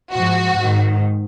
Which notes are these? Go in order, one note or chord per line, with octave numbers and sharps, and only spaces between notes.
G#2 F3 F#4
G#2 D#3